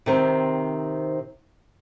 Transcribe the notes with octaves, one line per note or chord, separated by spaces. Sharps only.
C3 D#3 C4